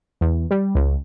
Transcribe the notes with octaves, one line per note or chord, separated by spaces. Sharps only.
E2
G3
C#2